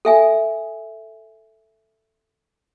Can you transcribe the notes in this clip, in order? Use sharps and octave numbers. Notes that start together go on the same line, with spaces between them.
A4 E5 G#5